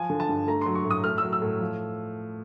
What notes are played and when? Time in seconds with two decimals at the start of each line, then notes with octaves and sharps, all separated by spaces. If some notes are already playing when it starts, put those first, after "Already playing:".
Already playing: F3 G#5
0.10 D3
0.20 A5
0.29 G2
0.47 A3 A#5
0.62 F#3 C6
0.75 C#6
0.85 A2
0.91 D#6
1.04 A3 F6
1.18 F#3 E6
1.33 E6
1.42 A2
1.60 F3